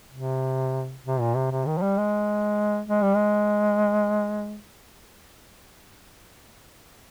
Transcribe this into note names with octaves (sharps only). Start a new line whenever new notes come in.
C3
C3
A#2
C3
C3
D#3
F3
G3
G#3
G#3
G3
G#3